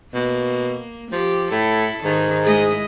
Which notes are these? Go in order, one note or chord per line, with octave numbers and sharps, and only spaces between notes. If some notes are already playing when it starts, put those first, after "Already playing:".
B2 A#3
F3 G4
A2 E4 A4
G#2 D#3
G#3 E4 G#4 D#5